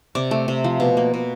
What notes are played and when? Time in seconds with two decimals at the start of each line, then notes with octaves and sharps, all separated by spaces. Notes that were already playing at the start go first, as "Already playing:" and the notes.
0.15 C3 D5
0.31 A3
0.48 C3
0.64 F3
0.80 B2
0.97 A#3
1.14 B2